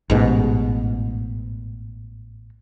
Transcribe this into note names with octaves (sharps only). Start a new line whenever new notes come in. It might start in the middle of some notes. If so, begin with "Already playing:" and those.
A1 G#2 B2